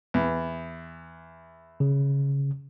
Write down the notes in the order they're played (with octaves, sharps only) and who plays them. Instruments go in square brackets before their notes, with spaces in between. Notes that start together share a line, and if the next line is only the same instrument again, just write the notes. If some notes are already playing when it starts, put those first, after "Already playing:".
[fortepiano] E2
[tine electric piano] C#3